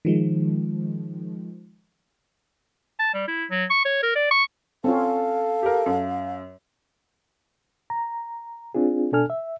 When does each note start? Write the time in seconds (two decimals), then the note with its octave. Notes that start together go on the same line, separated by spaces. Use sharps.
0.05 D#3 F3 G#3
2.99 A5
3.14 G3
3.28 E4
3.50 F#3
3.70 C#6
3.85 C#5
4.03 A#4
4.16 D5
4.31 C#6
4.84 C4 C#4 F4 A4 F5
5.62 G4 A#4
5.86 F#2
7.90 A#5
8.75 C4 D4 F4 G#4
9.12 B2 D4 A4 G#5 F6
9.30 E5